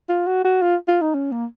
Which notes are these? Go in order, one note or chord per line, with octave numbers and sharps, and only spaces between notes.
F4
F#4
F#4
F4
F4
D#4
C#4
A#3